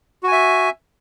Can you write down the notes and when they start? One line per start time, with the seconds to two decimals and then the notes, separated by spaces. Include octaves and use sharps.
0.23 F#4
0.28 G#5
0.32 E5